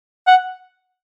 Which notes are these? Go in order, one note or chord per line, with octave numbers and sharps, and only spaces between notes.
F#5